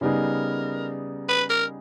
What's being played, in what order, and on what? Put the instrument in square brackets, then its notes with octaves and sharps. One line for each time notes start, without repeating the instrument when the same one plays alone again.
[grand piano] C#3 G3 B3 D#4 G#4 [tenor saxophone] A#4
[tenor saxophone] B4
A#4